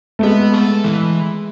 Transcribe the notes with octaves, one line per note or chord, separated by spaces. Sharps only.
A3
G#3 B3
A4
E3